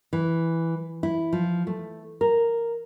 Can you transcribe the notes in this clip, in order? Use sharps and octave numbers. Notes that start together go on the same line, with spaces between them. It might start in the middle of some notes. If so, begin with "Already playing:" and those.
E3
E4
F3
A3
A#4